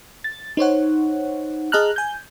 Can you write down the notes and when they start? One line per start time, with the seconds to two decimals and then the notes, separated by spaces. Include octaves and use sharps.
0.24 A6
0.57 D#4 C5 C#5 F#5
1.72 G#4 D#5 A5 A#5 F6 F#6
1.96 G#5 G6